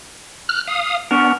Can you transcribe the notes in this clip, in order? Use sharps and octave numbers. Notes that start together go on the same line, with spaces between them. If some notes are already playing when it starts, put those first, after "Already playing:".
F6 F#6
F5 D#6
B3 C#4 D4 F#4 A#4